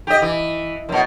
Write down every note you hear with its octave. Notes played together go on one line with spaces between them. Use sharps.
G4 D#5
E3
F#2 B2